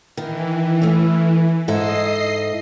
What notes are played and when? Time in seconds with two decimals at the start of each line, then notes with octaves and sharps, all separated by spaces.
0.17 D#3 E3
0.82 A3 C#4
1.68 G#2 E4 A4 D#5 C7